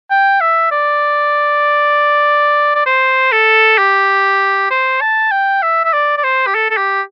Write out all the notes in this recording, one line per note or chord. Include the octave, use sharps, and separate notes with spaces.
G5
E5
D5
D5
C5
A4
G4
C5
A5
G5
E5
E5
D5
D5
C5
G4
A4
A4
G4